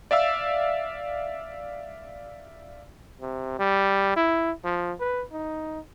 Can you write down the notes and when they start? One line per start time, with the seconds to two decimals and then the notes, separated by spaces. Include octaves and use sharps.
0.11 D5 E5 F5 E6
3.21 C3
3.59 G3
4.16 E4
4.64 F3
5.00 B4
5.32 D#4